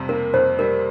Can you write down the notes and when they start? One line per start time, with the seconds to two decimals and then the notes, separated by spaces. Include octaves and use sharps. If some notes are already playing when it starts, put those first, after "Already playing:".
Already playing: F2 C3 G3
0.09 A#3 A#4
0.34 F2 C5
0.59 G3 A#4